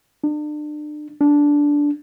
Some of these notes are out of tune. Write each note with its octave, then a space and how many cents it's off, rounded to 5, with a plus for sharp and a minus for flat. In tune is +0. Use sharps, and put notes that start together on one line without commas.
D4 +35
D4 -10